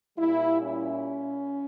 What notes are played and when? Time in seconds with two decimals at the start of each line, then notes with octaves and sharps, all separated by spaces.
0.18 A#2 G3 E4
0.62 C#4